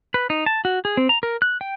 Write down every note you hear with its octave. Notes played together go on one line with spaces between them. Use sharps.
B4
D#4
A5
F#4
G#4
C4
A#5
A#4
F#6
G5